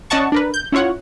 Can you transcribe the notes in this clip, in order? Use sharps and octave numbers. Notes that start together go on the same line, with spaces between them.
C#4 D5 D#5 F#5 A5 C#6
D4 A#4 B4
G6
C#4 E4 F4 C#5 F#5